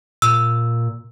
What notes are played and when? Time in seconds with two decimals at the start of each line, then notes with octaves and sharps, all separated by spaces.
0.22 A#2 E6